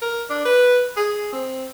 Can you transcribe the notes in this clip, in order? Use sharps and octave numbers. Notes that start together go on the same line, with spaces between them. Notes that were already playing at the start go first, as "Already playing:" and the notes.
A#4
D4
B4
G#4
C4